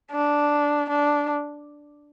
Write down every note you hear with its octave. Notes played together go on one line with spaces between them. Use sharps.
D4
D4